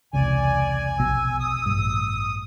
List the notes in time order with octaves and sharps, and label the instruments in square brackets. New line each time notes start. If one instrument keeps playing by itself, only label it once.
[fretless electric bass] E1 C2 C#3 [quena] D5 [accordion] G#5
[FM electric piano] A#1 B2 [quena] E6
[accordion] D#6
[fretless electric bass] A1 G2